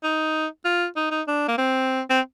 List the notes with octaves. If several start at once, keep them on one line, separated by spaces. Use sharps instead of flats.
D#4
F4
D#4
D#4
D4
A#3
C4
C4